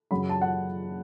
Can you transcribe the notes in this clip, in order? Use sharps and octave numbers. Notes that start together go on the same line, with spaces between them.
F#2 C#3 F#3 B5
A5
F#5